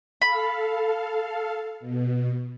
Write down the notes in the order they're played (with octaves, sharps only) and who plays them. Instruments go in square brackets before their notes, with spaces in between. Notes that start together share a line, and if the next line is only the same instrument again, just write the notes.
[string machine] A4 F5 [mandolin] B5
[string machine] B2